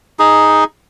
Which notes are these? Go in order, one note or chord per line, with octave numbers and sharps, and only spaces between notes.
D#4 G#4